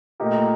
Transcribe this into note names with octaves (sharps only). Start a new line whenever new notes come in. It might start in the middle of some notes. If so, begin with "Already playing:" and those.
A#2 A3 D#4 G4 A#4